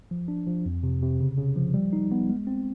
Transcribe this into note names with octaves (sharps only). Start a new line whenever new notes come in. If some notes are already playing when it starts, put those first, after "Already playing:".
F3
D4
F3
F2
C3
C3
C#3
C#3
F3
G3
D#4
B3
G#3
C4